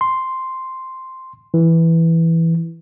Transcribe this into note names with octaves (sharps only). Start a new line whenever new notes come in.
C6
E3